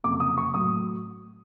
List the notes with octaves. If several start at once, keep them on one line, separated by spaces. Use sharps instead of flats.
F#1 F2 C3 D6
D#6
C#6
A2 F#3 D#6